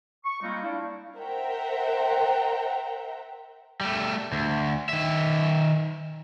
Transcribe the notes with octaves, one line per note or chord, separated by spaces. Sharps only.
C#6
G3 G#3 A#3 C4 D#4 F4
D4 E4 D5 F5
A#4 C5 E5 F#5 G5 A#5
G3 A3
D2
D#3 E5